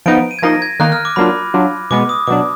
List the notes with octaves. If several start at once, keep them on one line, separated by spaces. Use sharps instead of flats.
F3 B3 D#4 D7
D#7
G#6
F3 A#3 D#4 A#6
G#6
D#3 A#3 D#4 F#6
F6
D6
F#3 A#3 D4 F4 B5
F#3 D4 F4
B2 G#3 B3 D6
D#6
B2 F#3 D4 D6